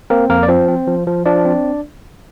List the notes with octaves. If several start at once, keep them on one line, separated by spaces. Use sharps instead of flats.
A#3 C4 A#4
F2 A#3 A#4
D5
F3 C4 C5
C4
F3
F3
F3 D4 D5
C4